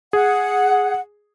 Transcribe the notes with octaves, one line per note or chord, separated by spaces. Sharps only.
G#4 F#5